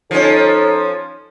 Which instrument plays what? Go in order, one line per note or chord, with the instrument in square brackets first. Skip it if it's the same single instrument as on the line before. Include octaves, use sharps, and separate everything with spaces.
[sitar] F3 C#4 [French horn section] D#4 A4 C#5